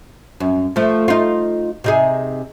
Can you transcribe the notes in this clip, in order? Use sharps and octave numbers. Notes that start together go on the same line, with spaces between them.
F#2
F3 A3
D#4 F4
C3 D#4 G#4